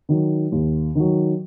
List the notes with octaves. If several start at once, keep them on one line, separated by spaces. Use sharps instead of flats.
D#3 F#3
D#2
D#3 F#3